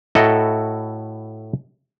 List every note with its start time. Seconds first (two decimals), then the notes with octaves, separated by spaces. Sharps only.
0.15 A2 E4 F#4 A4 D#5 A#5